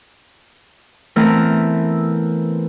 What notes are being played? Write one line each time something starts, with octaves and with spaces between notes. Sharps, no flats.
E3 A3 B3 C4 E4 A#4